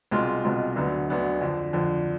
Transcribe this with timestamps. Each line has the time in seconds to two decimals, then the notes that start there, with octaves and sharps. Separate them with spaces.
0.11 C2 B2 G#3 C4 F4
0.44 C2 B2 G#3 C4 F4
0.76 D2 D3 F#3 B3 D4
1.09 D2 D3 F#3 B3 D4
1.41 F2 D3 F3
1.73 F2 D3 F3